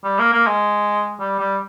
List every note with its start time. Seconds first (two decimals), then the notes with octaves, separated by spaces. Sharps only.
0.04 G3
0.19 A#3
0.33 A#3
0.47 G#3
1.20 G3
1.39 G3